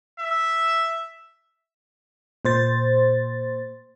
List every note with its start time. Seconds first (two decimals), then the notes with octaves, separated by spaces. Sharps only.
0.19 E5
2.45 A#2 C5 A6